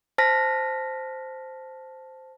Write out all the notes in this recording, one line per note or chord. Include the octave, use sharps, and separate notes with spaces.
C5 A5 F6 A#6 B6